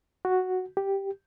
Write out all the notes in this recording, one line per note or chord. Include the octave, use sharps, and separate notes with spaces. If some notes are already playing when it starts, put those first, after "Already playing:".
F#4
G4